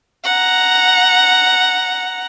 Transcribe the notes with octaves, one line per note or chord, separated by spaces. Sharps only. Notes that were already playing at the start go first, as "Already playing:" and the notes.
F#5 A#5